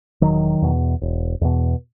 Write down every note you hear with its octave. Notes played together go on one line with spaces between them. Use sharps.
E1 D#3 F#3
E2 B2
E1
E2 B2